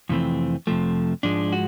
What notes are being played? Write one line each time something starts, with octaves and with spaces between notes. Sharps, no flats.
F2 C3 E3 A3 C4
F2 C3 F3 A3
G#2 F3 G#3 D4
F#4